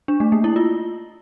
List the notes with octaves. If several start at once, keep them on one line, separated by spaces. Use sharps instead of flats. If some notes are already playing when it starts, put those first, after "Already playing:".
D4
A3
A#3
E4
F4